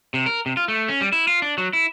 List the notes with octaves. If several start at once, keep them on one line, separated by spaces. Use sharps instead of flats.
C3
A#4
C3
F4
A3
C#4
G3
E4
F4
D4
F#3
E4